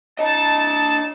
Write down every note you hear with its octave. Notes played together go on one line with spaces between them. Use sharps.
D4 D#5 A5